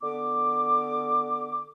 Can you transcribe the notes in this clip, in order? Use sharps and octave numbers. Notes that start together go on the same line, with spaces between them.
D3 B3 D6